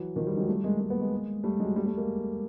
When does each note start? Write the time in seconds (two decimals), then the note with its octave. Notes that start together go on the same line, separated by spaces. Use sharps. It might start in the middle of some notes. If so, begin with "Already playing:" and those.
Already playing: E3 F#3
0.16 D#3 F3
0.27 F3 G3
0.37 F#3 G#3
0.48 G3 A3
0.64 G#3 A#3
0.80 G#3 A#3
0.90 A3 B3
1.01 G#3 A#3
1.44 G3 A3
1.60 F#3 G#3
1.76 G3 A3
1.86 G3 A3
1.97 G#3 A#3